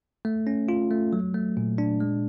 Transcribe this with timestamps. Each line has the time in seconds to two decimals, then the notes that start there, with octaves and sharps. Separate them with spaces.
0.25 A3
0.47 C#4
0.69 F4
0.90 A3
1.13 F#3
1.34 A3
1.57 A#2
1.78 D4
2.00 G#3